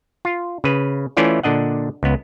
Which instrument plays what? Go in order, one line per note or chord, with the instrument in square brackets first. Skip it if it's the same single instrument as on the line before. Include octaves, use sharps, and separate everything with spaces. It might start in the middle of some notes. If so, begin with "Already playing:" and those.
[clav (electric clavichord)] F4
C#3 B4
E3 A3 C#4 E4 F4 D5
A#2 D3 D4 D#5 F#5
C#2 B3